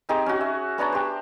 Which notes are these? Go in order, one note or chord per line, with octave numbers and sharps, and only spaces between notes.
C4 D#4 G4 G#4
C#4 F#4
E5
B3 D4 C#5 A#5
G4 C5